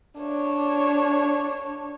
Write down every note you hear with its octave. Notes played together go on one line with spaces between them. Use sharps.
D4 C#5